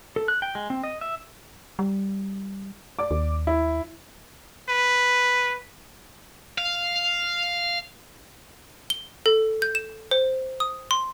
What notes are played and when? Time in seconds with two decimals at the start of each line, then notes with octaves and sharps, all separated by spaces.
0.16 A4
0.28 F#6
0.42 G5
0.55 G#3
0.70 C4
0.84 D#5
1.01 E5
1.79 G3
2.99 D5 D6
3.11 D#2
3.47 E4
4.69 B4
6.58 F5
8.90 G7
9.26 A4
9.62 G6
9.75 E7
10.11 C5
10.60 D#6
10.91 C6